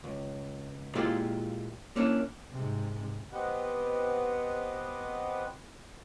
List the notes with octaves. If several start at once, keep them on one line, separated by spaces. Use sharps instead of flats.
C#2
A#2 G#3 E4 F4 G4 D5
A#3 C#4 D4 E4
G#2 C3
B3 C4 G4 B4 D#5 F#5